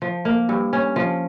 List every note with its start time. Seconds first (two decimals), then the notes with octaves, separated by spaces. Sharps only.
0.02 F3
0.25 A#3
0.49 G2
0.73 C#4
0.96 F3